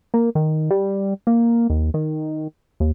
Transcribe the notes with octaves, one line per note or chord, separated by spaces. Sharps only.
A#3
D#3
G3
A#3
D#2
D#3
D#2